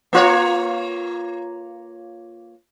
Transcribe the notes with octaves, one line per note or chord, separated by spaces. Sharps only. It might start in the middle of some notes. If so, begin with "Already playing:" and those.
A#3 F4 C#5